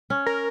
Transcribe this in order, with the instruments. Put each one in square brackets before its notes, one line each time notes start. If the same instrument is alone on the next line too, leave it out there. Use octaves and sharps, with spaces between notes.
[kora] C#4
[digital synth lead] A#4